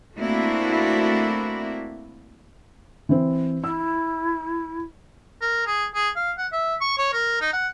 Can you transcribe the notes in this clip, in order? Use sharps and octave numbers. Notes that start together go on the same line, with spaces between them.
A3 A#3 C4 D4 E4 F#4
E3 C4
E4 E6
A#4
G#4
G#4
F5
F#5
E5
C#6
C#5
A#4
D#4
F#5